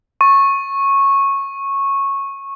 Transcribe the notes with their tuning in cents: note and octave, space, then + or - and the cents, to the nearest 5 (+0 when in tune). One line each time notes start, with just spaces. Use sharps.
C#6 -15